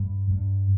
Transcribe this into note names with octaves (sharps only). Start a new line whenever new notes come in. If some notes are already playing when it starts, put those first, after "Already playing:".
Already playing: G2
G2